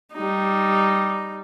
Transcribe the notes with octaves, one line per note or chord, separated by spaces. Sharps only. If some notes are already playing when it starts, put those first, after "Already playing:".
G3 D#4